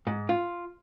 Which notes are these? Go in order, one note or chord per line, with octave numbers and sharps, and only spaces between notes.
G#2
F4